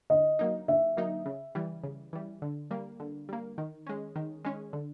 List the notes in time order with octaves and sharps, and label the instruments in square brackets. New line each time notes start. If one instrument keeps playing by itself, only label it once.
[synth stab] D3 [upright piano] D#5
[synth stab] F#3 A#3 D#4
[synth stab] D3 [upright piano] E5
[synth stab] F#3 A#3 D#4
C#3
E3 G3
C#3
E3 G3
D3
G3 A#3
D3
G3 A#3
D#3
G#3 C#4
D#3
G#3 C#4
D3